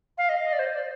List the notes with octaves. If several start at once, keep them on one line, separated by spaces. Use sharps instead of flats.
F5
D#5
D#5
D5
C5
D5